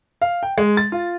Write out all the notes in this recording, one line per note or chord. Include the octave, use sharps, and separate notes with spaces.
F5
G5
G#3
A6
F4